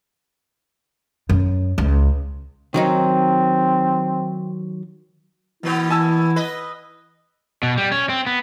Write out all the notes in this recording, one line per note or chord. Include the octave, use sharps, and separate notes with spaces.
F#2
C#2
D#3 F#3 C4 D#4
B2 E3 A#3 B3 E4
E4 G#5 A5 E6
B4 D#5
B2
G3
C#4
C4
B3